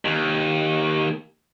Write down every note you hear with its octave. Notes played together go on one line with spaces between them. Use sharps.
D#2